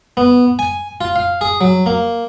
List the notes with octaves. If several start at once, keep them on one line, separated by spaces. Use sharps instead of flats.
B3
G#5
F4
F5
G#4
F#3
A#3